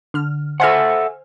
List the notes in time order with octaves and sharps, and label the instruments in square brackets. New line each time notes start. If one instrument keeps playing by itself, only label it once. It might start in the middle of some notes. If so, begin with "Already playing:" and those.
[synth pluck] D3 F6
[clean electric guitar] A4 E5 F#5 [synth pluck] C5 G#5 F6